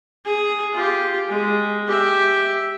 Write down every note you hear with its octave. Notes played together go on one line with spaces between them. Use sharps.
G#4
F4 G4
G#3
G4 E5